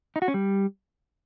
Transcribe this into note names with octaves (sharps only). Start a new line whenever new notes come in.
D#4
F#4
C#4
G3